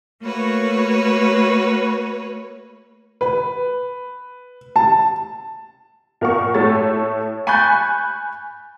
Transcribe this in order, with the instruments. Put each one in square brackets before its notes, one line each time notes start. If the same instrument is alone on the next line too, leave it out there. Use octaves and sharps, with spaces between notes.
[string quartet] A3 A#3 F#4 B4 C#5
[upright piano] B4
A5
[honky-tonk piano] A#2 A#4 F#5 C#6
A2 A3 C#5 A6
G#5 B5 C#6 F#6 G6 A6